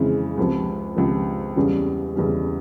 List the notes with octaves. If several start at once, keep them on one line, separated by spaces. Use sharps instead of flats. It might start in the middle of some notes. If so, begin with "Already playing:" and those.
Already playing: F2 C#3 E3 G#3
C#2 C3 F3
C#2 C3 F3
E2 C#3 G3 C#4
E2 C#3 G3 C#4